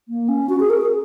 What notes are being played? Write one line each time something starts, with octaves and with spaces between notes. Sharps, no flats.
A#3
C#4
F#4
G#4
A#4
G#4